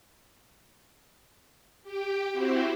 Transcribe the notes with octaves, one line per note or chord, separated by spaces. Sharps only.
G4 G5
C4 E4 F#4 G4 C5